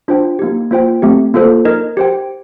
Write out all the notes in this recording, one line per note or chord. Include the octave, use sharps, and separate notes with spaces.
D4 F4 C5 G5
A#3 D#4 G4
A#3 F4 C5 G5
A3 C4 G4
A#3 F4 A4 C5
D#4 A#4 D#5
G4 C5 G5